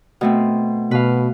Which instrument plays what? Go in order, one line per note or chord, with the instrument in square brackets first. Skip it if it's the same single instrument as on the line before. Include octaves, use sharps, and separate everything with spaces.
[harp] B2 A3 C4
[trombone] B2 [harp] B4 F5